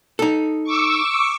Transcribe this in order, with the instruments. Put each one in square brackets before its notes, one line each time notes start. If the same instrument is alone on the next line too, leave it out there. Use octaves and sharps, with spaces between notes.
[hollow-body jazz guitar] D#4 A4
[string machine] C#6 D6 E6